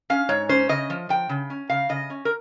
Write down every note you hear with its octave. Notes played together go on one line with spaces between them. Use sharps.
C#4 F5
G#2 C#5
C#4 C5
C#3 D#5
F3
F3 G5
C#3
C#4
C#3 F5
C#3 D#5
C#4
A#4